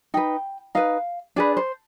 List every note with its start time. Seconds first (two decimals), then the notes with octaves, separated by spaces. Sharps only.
0.14 D#4 B4 G5
0.75 D#4 B4 F5
1.36 D4 G#4 B4 D5
1.57 C5